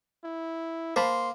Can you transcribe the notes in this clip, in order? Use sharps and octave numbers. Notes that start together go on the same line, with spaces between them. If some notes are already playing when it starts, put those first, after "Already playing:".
E4
A#3 C5 A5 B5 C6